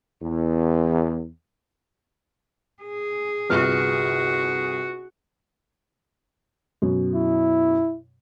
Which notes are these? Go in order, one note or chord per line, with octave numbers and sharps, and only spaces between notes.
E2
G#4
G1 C2 F4 F#4 B4 F6
F#2 B2
E4